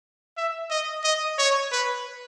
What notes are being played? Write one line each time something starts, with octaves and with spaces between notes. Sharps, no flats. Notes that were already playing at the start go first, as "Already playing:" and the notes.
E5
D#5
D#5
C#5
B4